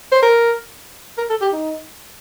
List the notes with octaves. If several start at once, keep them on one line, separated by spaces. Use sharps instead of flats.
C5
A#4
A#4
A4
G4
D#4